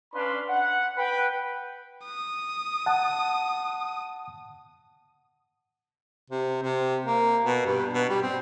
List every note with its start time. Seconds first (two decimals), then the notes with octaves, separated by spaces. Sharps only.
0.14 C#4 D4 B4 F5 B5 C6
0.49 F#5
0.98 B4 G5
2.05 D#6
2.86 F#5 A5
6.30 C3
6.63 C3
7.06 A#3
7.45 B2
7.65 G2
7.93 B2
8.10 G3
8.22 C4